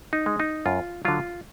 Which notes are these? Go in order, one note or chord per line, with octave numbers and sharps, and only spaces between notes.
D#4
G#3
D#4
F#2 F4
D3 F#3 F4